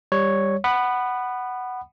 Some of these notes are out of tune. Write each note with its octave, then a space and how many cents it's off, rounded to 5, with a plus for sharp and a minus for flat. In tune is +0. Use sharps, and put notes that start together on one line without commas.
G3 +10 C#5 +0
F#5 +10 B5 +0 D#6 -30